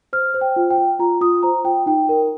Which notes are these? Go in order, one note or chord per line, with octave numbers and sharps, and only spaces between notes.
C5 F6
C5
G5
F4
G5
F4
F4 A#5
F4 D#6
C5 A#5
F4 G5
D#4 G5
A#4